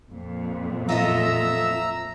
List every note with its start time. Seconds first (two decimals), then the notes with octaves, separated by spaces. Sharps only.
0.11 F2 A#2
0.89 F4 A4 D#5 E5 A#5 E6